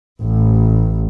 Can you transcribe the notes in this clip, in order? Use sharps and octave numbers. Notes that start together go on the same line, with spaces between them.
A1